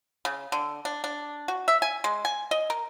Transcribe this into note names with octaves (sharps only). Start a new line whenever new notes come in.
C#3
D3
D4
D4
F#4
E5
G#5
G#3
G#5
D#5
A#4